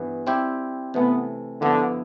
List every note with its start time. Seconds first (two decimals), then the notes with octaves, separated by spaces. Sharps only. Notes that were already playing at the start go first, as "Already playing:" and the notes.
Already playing: G2 E3 B3
0.26 G3 C4 E4 G4
0.94 C3 E3 A3 B3
1.61 G2 D3 F3 B3 E4